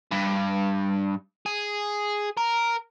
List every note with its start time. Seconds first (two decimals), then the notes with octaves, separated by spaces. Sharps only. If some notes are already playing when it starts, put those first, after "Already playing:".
0.12 G2
1.46 G#4
2.37 A#4